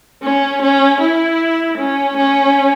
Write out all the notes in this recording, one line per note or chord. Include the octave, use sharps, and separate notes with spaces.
C#4
C#4
E4
C#4
C#4